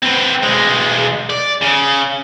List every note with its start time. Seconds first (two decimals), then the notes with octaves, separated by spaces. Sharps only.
0.03 C4 B4
0.43 B1 G#3
1.30 D5
1.63 C#3